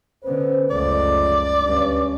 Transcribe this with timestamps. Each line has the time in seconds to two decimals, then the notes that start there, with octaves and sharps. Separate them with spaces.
0.24 D3 B3 C#4 B4 C5
0.70 F#1 C#2 F3 G#3 A3 D5
1.62 D2 G2 C#4